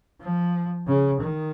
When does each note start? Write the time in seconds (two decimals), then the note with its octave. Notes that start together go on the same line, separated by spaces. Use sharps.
0.21 F3
0.88 C#3
1.21 D#3